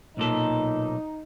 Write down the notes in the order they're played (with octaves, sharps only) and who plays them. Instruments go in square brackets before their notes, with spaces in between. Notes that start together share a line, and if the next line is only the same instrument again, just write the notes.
[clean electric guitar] B1 A#2 A4 [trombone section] D#4